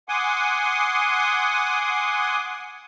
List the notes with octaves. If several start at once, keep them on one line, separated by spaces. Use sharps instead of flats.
F#5 G#5 C6 D6 D#6